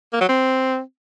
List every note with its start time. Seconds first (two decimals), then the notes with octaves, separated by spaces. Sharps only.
0.13 A#3
0.21 F#3
0.29 C4